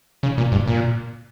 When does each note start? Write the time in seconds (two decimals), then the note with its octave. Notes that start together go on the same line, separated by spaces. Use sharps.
0.23 C#3
0.38 A#2
0.52 G2
0.67 A#2